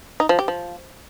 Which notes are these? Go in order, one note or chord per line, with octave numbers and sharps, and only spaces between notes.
D#4
F3
G4
F3